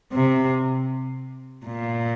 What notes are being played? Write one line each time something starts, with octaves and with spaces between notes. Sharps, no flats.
C3
A#2